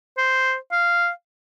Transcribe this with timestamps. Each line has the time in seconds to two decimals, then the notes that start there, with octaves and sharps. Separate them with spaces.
0.18 C5
0.72 F5